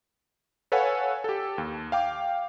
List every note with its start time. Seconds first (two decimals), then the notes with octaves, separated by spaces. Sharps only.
0.72 A4 B4 C#5 F5 F#5 G#5
1.24 G4 A4
1.58 D#2
1.92 F5 G5 D6